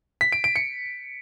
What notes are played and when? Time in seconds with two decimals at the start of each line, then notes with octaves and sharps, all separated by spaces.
0.21 B6
0.32 D7
0.44 D7
0.56 C#7